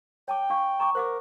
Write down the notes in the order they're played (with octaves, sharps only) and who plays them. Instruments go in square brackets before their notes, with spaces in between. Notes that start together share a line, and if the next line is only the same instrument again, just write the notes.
[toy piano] C#5 A5 D6 [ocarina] G5
[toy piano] D4 F5 C#6
A#5 C#6 D6
[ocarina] A#4 [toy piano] C5 F#5 D6